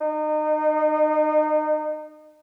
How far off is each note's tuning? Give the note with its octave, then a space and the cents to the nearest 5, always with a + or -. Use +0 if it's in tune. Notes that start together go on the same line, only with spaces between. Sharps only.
D#4 -30